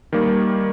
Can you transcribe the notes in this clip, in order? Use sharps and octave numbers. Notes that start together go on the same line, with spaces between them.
D#3 G3 A#3